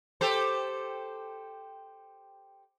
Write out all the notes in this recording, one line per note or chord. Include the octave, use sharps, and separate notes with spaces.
G4 A4 C5